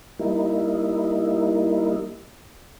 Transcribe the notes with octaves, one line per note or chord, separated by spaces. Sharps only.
G3 A#3 D#4 E4